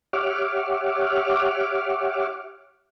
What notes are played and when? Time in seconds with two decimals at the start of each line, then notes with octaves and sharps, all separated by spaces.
0.13 G4 C#5 E5 F#5 D6 F6